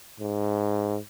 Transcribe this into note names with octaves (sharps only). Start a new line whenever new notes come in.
G#2